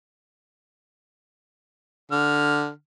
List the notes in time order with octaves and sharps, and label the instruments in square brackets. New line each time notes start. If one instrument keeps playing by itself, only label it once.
[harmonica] D3 F6